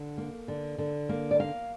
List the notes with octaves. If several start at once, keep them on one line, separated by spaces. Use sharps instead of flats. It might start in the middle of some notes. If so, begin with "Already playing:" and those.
Already playing: D3
A#3
D3
D3
A#3
D5
A#3 F5